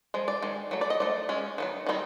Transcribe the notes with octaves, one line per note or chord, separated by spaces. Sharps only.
F3 G#3
D5
D#3 G#3
F#3 A3
D5
D#5
F3 A3 D5
G#3 C#4
D#3 F#3 B3
D#3 G3 C4 D#4